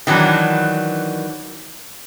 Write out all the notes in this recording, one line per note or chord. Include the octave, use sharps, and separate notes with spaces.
D#3 E3 F#3 D4